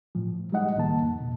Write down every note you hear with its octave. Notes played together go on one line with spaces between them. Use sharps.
A2 F3
G3 G#3 D#4 D#5 F#5
C#2 A2 D#3 A#3 A5
F2
B2